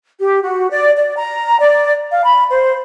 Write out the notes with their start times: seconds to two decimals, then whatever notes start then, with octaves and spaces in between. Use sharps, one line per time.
0.19 G4
0.43 F#4
0.69 D5
0.96 D5
1.16 A#5
1.59 D5
2.12 F5
2.24 B5
2.50 C5